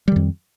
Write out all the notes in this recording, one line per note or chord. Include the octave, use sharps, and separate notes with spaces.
F2 D#3 G3